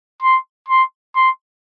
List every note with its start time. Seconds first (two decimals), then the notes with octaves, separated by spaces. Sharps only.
0.22 C6
0.68 C6
1.15 C6